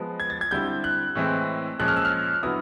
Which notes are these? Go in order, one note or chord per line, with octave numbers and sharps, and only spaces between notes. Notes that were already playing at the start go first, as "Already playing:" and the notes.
Already playing: F3 G#3 B3
G#6
A6
G#6
D3 G3 C4 E4 G6
F#6
A2 E3 G#3 C4
A#2 F3 G#3 C#4 F#6
F6
E6
F6
D3 F#3 B3 E4 D#6